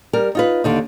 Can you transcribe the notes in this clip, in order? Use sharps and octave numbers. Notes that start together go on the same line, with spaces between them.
G3 A#4
D#4 F4 B4
D#2 D3 D#4